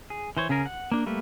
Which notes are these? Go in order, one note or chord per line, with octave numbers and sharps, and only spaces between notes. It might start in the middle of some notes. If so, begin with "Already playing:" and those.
G#4
E3 C5 C#5
C#3 C#4 G#4 A#4
F#5
A#3 D4
G3 A3 A#3 B4